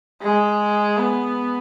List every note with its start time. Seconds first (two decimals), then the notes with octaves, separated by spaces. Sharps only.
0.22 G#3
0.98 B3